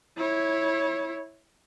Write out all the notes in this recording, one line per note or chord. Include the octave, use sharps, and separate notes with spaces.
E4 C#5